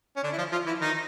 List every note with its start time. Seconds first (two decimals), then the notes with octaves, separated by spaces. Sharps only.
0.16 C#4
0.24 D3 D4
0.33 E4
0.38 F3 F4
0.52 F3 F4
0.66 E3 E4
0.81 D#3 D#4